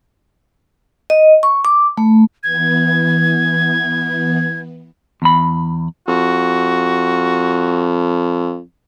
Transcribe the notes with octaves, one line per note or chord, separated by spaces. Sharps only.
D#5
C#6
D6
A3
E3 B3 G#6
E2 B5
F2 F#4